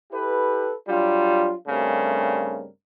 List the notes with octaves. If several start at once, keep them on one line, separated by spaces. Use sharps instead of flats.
E4 G4 A4 B4
F#3 G3 D4 F4
G2 C#3 G3 A3 C4 A#4